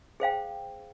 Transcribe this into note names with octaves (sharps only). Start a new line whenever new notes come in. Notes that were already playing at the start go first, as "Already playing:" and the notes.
G#4 C5 F5 G5